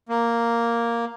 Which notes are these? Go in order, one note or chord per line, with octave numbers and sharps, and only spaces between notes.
A#3